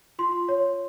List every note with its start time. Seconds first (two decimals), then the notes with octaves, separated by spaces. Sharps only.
0.19 F4 C6
0.49 C#5